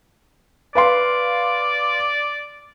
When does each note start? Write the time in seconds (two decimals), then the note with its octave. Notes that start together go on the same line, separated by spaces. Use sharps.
0.75 B4 D5 F5 C6